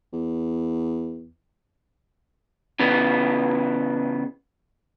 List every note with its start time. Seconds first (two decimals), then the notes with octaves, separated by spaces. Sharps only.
0.13 E2
2.80 C#3 E3 B3